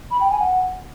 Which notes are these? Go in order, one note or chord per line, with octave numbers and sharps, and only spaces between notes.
B5
G5
G#5
F#5